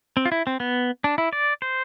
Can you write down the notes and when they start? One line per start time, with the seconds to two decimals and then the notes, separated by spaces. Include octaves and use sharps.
0.17 C4
0.25 F4
0.32 E4
0.47 C4
0.60 B3
1.04 D4
1.18 E4
1.33 D5
1.62 C5